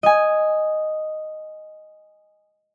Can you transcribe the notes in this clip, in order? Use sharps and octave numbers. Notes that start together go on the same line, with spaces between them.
D#5 G#5